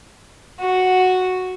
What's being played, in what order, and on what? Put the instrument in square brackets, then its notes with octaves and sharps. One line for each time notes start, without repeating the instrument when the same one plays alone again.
[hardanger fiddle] F#4